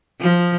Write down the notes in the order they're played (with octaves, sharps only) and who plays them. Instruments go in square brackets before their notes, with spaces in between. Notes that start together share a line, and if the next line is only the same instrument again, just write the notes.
[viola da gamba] F3